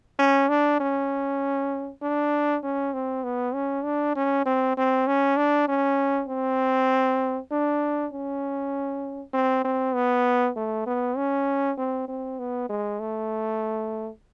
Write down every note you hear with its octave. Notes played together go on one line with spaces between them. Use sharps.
C#4
D4
C#4
D4
C#4
C4
B3
C#4
D4
C#4
C4
C4
C#4
D4
C#4
C4
D4
C#4
C4
C4
B3
A3
B3
C#4
C4
C4
B3
G#3
A3